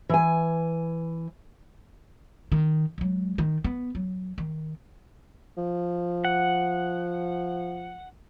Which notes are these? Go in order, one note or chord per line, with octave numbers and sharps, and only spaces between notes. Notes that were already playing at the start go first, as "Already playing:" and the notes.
E3 G#5
D#3
F#3 G#3
D#3
B3
F#3
D#3
F3
F#5